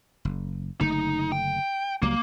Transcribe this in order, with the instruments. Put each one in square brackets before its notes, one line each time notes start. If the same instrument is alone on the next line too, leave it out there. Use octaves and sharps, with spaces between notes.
[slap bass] F#1
[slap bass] F#1 D3 A3 [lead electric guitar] D#4
[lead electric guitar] G5
[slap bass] C#2 F#3 G3 [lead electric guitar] A#3